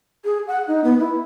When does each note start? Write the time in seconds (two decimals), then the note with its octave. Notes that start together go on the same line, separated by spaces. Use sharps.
0.25 G#4
0.47 F#5
0.68 D#4
0.84 B3
1.00 E4